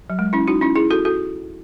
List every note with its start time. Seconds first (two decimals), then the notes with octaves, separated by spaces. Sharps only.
0.10 F#3
0.19 G#3
0.33 C#4 E4
0.47 D#4 F#4
0.61 C#4 E4
0.76 E4 G#4
0.91 F#4 A4
1.05 F#4 A4